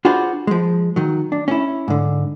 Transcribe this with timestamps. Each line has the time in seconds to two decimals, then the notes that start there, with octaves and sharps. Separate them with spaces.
0.05 D4 F4 F#4 G#4 B4 C5
0.47 F3 G#3
0.96 D#3 F#3
1.32 D4
1.48 C#4 E4
1.88 G#2 D3